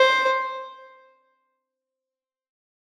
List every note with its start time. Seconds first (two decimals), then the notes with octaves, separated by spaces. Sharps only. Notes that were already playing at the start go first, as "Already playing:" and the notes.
Already playing: C5